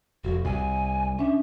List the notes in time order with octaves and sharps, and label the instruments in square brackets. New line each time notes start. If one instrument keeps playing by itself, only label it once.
[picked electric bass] F1 [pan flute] F#4
[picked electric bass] C2 [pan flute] G#5
[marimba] C#4 D4 [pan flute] E5